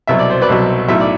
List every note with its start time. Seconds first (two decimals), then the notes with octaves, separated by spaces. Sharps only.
0.07 C2 B2 F#3 E5
0.19 D5
0.30 C5
0.42 B4 D5
0.49 C2 B2 F#3
0.88 B1 A2 F#3 E5
1.00 D5